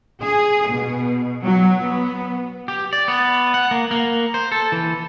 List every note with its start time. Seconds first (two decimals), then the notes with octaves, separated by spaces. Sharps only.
0.22 G#4
0.71 B2
1.44 F#3
1.82 B3
2.68 G4
2.93 D5
3.08 B3
3.54 F#5
3.71 A#3
3.91 A#3
4.34 C5
4.52 A4
4.72 E3